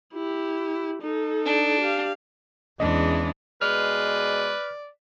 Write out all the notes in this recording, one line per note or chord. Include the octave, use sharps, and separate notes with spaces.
E4 G4
D#4 A4
D4
G4 F5
E2 E3 G#3 C#4 D4 D#5
B2 G#3 B4 D5 F6